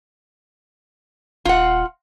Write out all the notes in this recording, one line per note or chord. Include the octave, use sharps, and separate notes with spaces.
D#1 F4 F#5